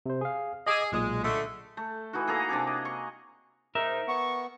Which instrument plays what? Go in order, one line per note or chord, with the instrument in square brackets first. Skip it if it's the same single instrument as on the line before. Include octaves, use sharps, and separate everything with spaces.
[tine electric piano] C3 C5
G#4 F5
[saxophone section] G#4 [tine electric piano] D#5 D6 E6
[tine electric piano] B1 A#2 D#6 [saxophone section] G#3
[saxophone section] D3 G#3 A3
[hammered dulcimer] A3
E3 D#4 E4 F#4
A#3 G#4 A4 A#5
C3 D4 G#4 D6
D#5
C#6
[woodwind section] G#2 D#4 [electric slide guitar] A#4 E5
[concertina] B3 [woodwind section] C#6